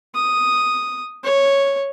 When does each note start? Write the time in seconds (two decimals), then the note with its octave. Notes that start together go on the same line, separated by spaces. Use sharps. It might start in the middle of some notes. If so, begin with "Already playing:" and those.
0.14 D#6
1.24 C#5